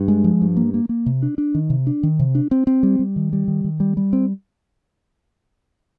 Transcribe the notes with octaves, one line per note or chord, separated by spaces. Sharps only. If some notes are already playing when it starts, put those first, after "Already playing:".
Already playing: G2
G#3
F3
G2
A#3
A#3
A#3
C3
D4
D4
D#3
C3
D4
D#3
C3
D4
C4
C4
G3
G3
D#3
G3
D#3
D#3
G3
G3
C4